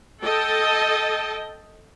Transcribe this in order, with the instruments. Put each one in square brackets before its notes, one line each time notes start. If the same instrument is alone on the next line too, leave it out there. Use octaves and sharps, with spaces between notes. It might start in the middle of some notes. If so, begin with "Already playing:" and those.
[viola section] A4 D#5 G5 A5